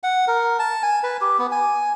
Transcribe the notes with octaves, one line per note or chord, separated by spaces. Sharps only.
F#5
A#4
A5
G#5
B4
G4
B3
G#5